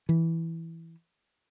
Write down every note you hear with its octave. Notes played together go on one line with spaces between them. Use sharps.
E3